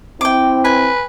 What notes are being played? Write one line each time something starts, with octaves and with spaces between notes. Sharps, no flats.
C4 E4 G5 D6
B4 G#5